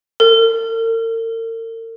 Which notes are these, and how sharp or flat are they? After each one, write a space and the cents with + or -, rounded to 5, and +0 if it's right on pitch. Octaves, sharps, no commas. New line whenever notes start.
A#4 -45